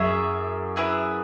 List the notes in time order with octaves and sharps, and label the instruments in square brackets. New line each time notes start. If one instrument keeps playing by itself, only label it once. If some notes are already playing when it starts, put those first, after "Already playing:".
Already playing: [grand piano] F#2 [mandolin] E4 G#4 C#5 E5
[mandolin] E4 G#4 B4 E5